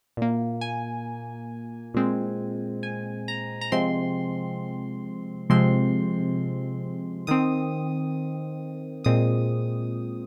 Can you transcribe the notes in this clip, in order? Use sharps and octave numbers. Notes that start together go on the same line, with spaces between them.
A#2 A#3
G#5
A#2 G#3 C4
G#5
A#5
A#5
C3 F3 G#3 C4 C6
C3 F3 G#3 C4 C6
D#3 C4 D#6
A#2 G#3 C4 D#6